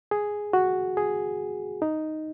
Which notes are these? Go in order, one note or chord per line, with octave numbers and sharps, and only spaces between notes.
G#4
F#4
G#4
D#4